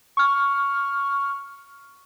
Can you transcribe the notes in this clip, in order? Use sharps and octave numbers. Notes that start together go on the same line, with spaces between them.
C#6 F6